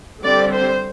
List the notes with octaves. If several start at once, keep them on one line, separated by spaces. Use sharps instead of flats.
D3 G3 C4 D5
C5